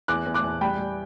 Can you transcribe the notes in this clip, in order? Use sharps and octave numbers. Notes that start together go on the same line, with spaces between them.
E2 D6 F#6
E2
D6 F#6
E2
G3 G5 B5
G3